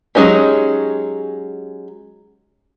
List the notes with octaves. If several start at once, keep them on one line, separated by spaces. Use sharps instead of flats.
F#3 G#3 C#4 D#4 G4